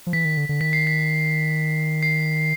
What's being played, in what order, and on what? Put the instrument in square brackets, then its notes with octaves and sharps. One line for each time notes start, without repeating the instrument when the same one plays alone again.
[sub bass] F3
[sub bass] E3 [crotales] B6
[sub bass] D#3
D3
D3
[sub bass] D#3 [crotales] B6
[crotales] C7
B6
C7